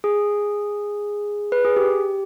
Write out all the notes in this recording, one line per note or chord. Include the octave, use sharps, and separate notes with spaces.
G#4
B4
G#4
G4